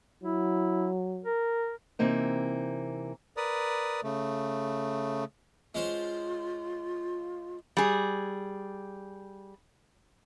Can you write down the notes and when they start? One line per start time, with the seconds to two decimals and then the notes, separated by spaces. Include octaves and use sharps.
0.23 F#3 E4
1.24 A#4
1.99 C3 E3 A#3 C4 D#4
3.37 A#4 B4 D5 D#6
4.04 C#3 A3
5.75 G#3 C#4 F4 C5
7.77 G3 G#4